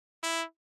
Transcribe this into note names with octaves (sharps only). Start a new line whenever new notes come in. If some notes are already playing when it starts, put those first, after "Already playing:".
E4